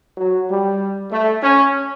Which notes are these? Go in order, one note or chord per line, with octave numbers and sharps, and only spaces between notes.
F#3
G3
A3
C#4